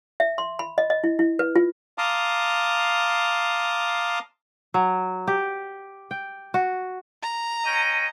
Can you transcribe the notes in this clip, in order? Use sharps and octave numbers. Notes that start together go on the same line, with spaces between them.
E5
C6
B5
D#5
D#5
E4
E4
B4
F4
F5 A5 A#5 C6 D6 D#6
F#3
G4
G5
F#4
A#5
C#4 D#5 G5